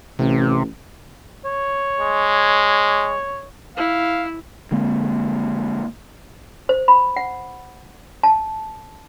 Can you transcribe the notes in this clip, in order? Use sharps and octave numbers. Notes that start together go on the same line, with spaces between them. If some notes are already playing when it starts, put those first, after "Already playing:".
A1 C3
C#5
G#3
E4 F5
D3 G#3 A#3 C4
C5
B5
F#5
A5